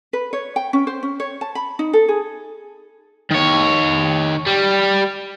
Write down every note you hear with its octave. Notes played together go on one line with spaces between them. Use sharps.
B4
C#5
G5
C#4
C5
C#4
C#5
A5
B5
D#4
A4
G#4
D#3 C#5
G3